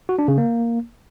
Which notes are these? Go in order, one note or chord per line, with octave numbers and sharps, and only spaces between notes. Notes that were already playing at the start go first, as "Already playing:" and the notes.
F#4
D4
C#3
A#3